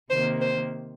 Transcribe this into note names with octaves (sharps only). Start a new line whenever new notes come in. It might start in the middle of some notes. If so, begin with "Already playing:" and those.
C3 D#3 A#3 C5
C5